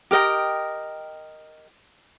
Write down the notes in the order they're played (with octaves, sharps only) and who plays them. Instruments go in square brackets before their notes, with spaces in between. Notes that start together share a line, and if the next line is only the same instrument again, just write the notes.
[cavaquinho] G4 A#4 D#5 G5